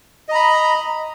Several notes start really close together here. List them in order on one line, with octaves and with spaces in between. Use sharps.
D#5 A#5 B5